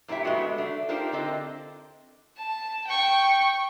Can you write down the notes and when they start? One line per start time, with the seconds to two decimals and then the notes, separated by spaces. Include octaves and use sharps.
0.08 F#2 A#2 E4 G4 E5
0.24 G#3 A3 B3 D4 F#4 G#4
0.58 A3 D4
0.89 D4 D#4 F4 G4 A#4 C5
1.12 D3 C4 A4 D#5
2.37 A5
2.87 G5 C#6